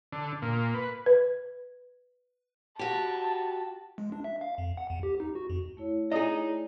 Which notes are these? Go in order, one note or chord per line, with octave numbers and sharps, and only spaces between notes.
D3
A#2
B4
B4
F#4 G4 A5
G#3
D4
E5
F5
F2
F#5
E2
G4
D#4
F#4
F2
A3 E4 C#5
D#4 G#4 D5 D#5